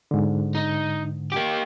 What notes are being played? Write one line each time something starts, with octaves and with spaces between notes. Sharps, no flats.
G#2 D3
D#4
A#3 G4